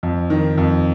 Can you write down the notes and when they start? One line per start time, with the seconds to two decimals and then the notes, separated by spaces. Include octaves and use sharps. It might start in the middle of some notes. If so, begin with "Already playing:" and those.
0.03 F2
0.30 D#3
0.58 F2